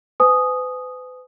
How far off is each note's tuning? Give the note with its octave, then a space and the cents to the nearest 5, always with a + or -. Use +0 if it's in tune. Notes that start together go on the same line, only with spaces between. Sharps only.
B4 +40 G#5 +20 D#6 -5